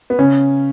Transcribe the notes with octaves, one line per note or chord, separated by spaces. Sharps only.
B3
C#3 C#4